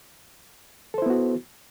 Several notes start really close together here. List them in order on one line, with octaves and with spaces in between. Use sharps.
A4 C5 E4 B3 F#4